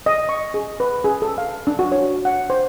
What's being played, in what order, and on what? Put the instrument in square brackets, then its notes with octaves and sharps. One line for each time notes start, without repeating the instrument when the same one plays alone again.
[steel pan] D#5
C#6
G#4
B4
G#4
A4
F5
D4
F#4
C#5
F#5
C5